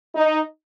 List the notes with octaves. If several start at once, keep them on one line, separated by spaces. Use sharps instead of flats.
D#4